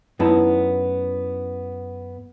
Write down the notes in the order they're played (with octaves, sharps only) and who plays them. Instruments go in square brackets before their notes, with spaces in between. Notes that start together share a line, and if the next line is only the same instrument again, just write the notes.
[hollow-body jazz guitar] F#2 B3 D#4 E4 A5